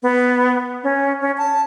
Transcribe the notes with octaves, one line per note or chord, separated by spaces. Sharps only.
B3
C#4
C#4
A5